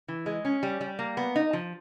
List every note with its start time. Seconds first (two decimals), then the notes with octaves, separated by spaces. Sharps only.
0.08 E3
0.26 G#3
0.45 C#4
0.63 G3
0.81 G3
0.99 A#3
1.17 B3
1.36 D#4
1.53 F3